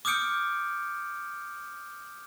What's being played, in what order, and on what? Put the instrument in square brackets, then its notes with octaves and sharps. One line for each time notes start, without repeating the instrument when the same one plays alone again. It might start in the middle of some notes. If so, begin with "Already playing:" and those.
[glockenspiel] D6 D#6 F6 G6 C#7 D7